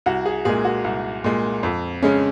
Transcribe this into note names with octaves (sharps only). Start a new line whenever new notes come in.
C2 F#4
G#4
A#2 G#3 G#4
F#4
C2
A#2 G#3
F2
C#3 G#3 C#4